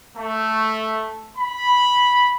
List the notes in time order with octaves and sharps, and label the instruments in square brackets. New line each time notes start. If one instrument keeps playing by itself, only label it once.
[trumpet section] A3
B5